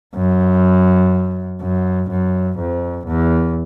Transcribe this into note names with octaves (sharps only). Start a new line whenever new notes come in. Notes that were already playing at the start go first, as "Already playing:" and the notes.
F#2
F#2
F#2
F2
E2